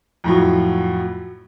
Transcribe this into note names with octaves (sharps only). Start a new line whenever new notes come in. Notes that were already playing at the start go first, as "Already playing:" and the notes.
F2 A2 F#3